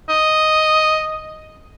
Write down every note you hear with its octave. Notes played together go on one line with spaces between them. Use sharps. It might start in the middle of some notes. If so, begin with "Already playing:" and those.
D#5